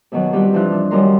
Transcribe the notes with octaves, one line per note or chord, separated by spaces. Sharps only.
F#2 B2 D#3 F#3
G3 C4 F4 G4 B4
G2 C3 E3 F3 F4 F#6
D4
F#2 D#3 G3 A#4 A#5 C6